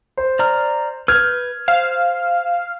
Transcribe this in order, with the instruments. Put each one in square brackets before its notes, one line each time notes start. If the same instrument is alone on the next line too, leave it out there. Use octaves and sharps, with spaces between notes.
[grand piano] C5
[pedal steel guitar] D5 A#5 F6
[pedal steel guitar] B4 G6 [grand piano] F6 G#6
[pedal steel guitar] C5 [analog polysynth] F5